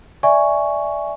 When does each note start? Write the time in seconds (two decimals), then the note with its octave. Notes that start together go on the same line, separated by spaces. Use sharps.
0.23 D5 E5 G#5 C#6